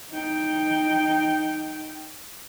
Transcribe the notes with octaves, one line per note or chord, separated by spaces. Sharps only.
D#4 G5